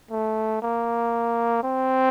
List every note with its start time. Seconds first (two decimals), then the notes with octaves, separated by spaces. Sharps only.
0.11 A3
0.62 A#3
1.63 C4